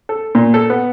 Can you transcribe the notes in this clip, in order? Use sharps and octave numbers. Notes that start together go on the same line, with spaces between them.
A4
A#2
A4
B3